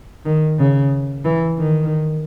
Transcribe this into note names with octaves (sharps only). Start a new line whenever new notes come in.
D#3
C#3
E3
D#3